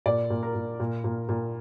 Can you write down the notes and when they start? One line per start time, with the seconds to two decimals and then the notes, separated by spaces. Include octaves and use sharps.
0.06 A#2 D5
0.30 A#2
0.43 A#4
0.55 A#2
0.80 A#2
1.04 A#2
1.29 A#2